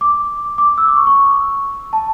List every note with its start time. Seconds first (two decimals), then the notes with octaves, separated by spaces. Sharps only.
0.01 D6
0.58 D6
0.78 E6
0.88 D6
0.96 C#6
1.07 C#6
1.93 A5